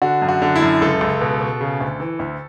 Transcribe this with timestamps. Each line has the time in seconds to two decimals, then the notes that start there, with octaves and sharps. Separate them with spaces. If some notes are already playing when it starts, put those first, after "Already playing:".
0.02 D3 F#4
0.22 F#2
0.28 F#4
0.42 D3
0.56 E4
0.62 F#2
0.81 C#2 A4
1.01 C#2
1.21 B2
1.41 B2
1.61 C#3
1.80 D2
2.00 E3
2.19 D2